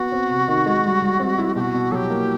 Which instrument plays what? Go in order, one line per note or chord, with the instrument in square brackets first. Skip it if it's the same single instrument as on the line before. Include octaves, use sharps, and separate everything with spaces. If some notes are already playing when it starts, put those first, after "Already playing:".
Already playing: [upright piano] B3 [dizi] F#4
[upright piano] C4
C3
D#3
G#3
G3
G3
C4
E4
[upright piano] B2 [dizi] G4
[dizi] F#4
[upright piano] B2
[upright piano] F#3 [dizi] G4 A4
[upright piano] A#3